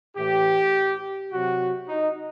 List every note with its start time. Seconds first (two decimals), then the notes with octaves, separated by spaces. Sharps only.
0.17 A2 E3 G4
1.32 C3 F#3 F#4
1.88 D#4